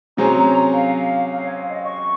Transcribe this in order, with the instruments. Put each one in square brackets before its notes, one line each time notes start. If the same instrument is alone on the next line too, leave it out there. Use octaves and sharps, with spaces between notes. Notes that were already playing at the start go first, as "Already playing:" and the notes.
[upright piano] C3 F#3 C#4 G#4 C5 [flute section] A#5
[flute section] A#5
F5
F5
C#5
F5
D#5
C#6